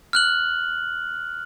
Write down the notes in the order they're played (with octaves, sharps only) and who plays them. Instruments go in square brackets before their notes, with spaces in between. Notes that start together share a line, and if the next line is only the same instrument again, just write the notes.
[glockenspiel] F6 F#6 F#7